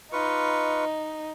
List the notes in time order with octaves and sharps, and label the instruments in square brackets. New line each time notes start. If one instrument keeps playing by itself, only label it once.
[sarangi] D#4 [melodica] F4 B4 C#6